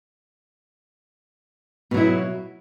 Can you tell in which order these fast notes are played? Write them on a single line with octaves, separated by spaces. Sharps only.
B2 F#3 E4